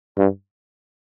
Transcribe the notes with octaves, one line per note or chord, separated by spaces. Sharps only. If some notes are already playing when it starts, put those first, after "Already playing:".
G2